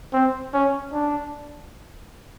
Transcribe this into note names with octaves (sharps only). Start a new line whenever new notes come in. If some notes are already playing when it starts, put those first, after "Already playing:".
C4
C#4
D4